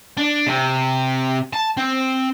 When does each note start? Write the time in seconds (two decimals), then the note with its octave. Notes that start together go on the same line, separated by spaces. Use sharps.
0.17 D4
0.47 C3
1.53 A5
1.77 C4